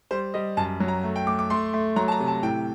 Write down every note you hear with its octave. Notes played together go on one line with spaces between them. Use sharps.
G3 C5
G3 D#5
F#2 A5
F#3
A#5
A3
G5
A3 D6
D6
A3 C6
A3
F#3 A#5
A5
A#5
C3
A5
A2 G5